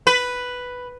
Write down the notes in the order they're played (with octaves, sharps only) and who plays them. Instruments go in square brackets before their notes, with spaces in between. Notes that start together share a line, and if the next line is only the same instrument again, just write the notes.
[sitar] B4